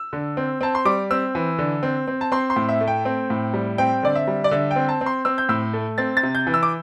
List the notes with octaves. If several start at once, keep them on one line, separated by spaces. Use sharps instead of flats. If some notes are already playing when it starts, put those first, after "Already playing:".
Already playing: E6
D3
C4
C4 A5
C6
G3 D6
C4 E6
E3
D3
C4
C4
A5
C4 C6
C6
A2
E5
A3
G5
C4
A2
G3
C4 G5
D3 D5
E5
G3
D5
D3 E5
G5
C4
A5
C4
C6
C4 E6
G6
A2 E6
A3
C4 A6
A6
C3
G6
E3
E6
D6